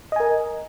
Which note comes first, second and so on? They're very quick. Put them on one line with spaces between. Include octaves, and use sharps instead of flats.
D#5 G#5 A#4